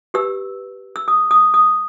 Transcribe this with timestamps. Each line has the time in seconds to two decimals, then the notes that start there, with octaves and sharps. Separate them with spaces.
0.14 G4 B4 E6
0.96 E6
1.08 D#6
1.31 D#6
1.54 D#6